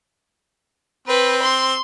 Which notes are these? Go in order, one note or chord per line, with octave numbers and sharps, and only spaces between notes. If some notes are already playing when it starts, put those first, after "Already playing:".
C4 B4
C6